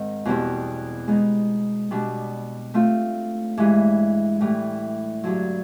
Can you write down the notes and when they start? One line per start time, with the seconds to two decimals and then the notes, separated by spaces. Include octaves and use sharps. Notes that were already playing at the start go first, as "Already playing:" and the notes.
Already playing: G#2 D#3 C4
0.25 E2 B2 G3 C4
1.08 G#3 B3 D#4
1.91 B2 G3 B3 D4
2.74 A3 C4 F4
3.57 G2 E3 G#3
4.41 A2 E3 G3
5.24 G2 D3 F#3